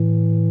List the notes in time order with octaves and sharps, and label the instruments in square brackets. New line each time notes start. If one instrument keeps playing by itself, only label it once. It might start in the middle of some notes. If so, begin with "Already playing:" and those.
Already playing: [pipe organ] A2 E3